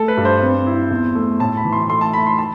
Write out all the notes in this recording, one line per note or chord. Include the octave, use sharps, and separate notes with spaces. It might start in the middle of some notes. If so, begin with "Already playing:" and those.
Already playing: A3 A4
B4
G2
C5
C4
E4
E2
A3
A2 A5
B5
E3
C6
A3 C6
A5
A3 B5
C6
A5